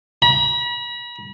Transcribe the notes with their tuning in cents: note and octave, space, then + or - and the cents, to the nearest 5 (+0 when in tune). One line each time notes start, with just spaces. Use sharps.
B5 -40